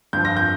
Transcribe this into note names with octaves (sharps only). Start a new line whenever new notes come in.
G2 F3 G6
A#6
G6